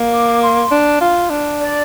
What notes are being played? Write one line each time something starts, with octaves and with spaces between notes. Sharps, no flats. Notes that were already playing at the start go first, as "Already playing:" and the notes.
Already playing: A#3
D6
C6
D4
F4
D4
D5